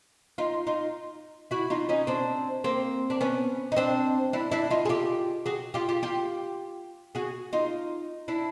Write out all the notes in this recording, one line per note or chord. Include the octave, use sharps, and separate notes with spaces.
D#4 F4
D#4 F4
E4 F#4
D#4 F4
C#4 D#4
C4 D4
A#3 C4
D4
B3 C#4
D#4
C4 D4
D4 E4
D4 E4
D#4 F4
G#4
F4 G4
F#4 G#4
F4 G4
F4 G4
F4 G4
F#4 G#4
D#4 F4
D4 E4